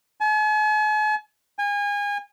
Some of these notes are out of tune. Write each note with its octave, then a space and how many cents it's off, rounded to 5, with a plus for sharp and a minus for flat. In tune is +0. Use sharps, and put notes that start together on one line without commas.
G#5 +45
G#5 -30